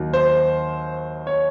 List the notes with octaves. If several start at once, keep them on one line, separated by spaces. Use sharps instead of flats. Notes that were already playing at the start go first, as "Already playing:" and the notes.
Already playing: D#2 D#3 F#3
C5
C#5